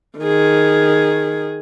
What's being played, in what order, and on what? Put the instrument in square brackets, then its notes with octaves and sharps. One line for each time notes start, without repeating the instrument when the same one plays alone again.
[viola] D#3 G#4